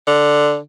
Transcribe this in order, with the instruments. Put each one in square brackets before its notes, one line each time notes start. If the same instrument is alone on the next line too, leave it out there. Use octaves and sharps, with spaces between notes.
[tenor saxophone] D3